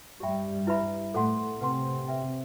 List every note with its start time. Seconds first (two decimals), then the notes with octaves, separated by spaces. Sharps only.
0.20 G2 G3 G4 C5 E5 G5 B5
0.67 E4 B4 E5 B5
1.13 A2 A3 A4 C5 F#5 C6
1.60 C3 C4 B4 F#5 C6
2.08 B4 E5 G5